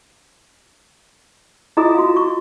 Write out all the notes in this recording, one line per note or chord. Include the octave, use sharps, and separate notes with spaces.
E4 F4 G#4 D#5 A#5 D#6
F#4 F5
C#6